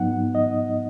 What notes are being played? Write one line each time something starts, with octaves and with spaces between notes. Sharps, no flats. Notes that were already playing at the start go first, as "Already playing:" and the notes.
Already playing: G#2 F#3 B3 D#4 F#5
D#5